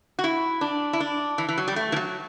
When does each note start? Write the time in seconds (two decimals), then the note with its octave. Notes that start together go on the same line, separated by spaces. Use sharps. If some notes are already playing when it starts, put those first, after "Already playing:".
0.19 F#4
0.24 E4
0.61 D4
0.93 E4
1.00 D4
1.38 E3
1.48 E3
1.58 F#3
1.68 G3
1.76 A3
1.92 E3
1.96 F#3